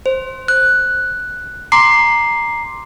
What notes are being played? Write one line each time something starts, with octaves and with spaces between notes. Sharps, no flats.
C5
F#6
A#5 C6 D6 C7